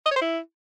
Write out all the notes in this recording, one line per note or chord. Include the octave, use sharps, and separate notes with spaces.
D#5
C#5
C5
E4